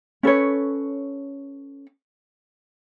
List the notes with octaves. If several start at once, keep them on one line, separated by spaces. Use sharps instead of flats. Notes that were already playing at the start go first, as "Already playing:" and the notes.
C#4 A4 B4 C#5